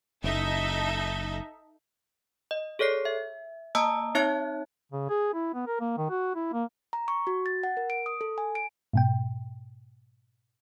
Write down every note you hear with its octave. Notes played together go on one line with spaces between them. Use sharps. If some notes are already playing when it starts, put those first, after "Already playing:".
F#1 D#4 A4 E5
D#5
G#4 A4 C#5 D5 C7
E5
A#3 D#5 A5 A#5 D#6 E6
C4 D#4 C#5 E5 A5 F#6
C#3
G#4
E4
B3
A#4
A#3
D#3
F#4
E4
A#3
A#5
C#6
F#4
A6
F#5
A#4
D7
D#6
A4
G#5
D7
G#2 B2 G5